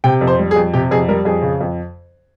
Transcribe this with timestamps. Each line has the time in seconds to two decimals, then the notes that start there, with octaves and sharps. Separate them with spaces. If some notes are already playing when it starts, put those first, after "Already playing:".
0.04 C3 G5
0.21 F2
0.27 C5
0.39 G3
0.51 G#4
0.56 F2
0.74 C3 G4
0.91 F2 G#4
1.08 G3 A#4
1.25 F2 G#4
1.42 C#3
1.61 F2